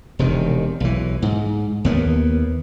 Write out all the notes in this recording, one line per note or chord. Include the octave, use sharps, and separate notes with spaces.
E1 C3 D#3
B1 E3
G#2
D#2 A#3 B3